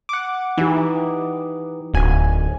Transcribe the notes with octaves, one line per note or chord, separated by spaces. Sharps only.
F#5 D6
E3 D#4 G4
D1 D2 G#5